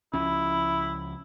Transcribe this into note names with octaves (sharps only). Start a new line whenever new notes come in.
C#2 F3 C#4 E4